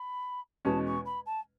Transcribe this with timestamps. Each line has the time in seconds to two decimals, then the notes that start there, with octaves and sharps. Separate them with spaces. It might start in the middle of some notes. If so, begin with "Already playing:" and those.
Already playing: B5
0.65 E2 B2 G#3 C#4 A5
0.85 C#6
1.05 B5
1.26 A5